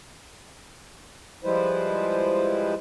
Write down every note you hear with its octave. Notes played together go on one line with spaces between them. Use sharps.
F3 G3 G#3 E4 B4 C5